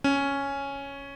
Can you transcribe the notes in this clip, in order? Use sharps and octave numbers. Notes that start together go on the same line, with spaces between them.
C#4